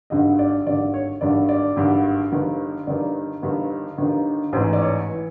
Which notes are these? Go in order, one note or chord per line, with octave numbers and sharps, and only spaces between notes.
G#1 G2 D3 D#5
D5
G#1 G2 D3 D5
C#5
G#1 G2 D3 D5
D5
G#1 G2 D3
G1 G2 D#3
G1 G2 D#3 D5
G1 G2 D#3
G1 G2 D#3
A1 G#2 E3 C5
D5
C#5
E3